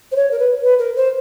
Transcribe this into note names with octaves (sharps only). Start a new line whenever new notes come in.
C5
C#5
A#4
B4
B4
A#4
C5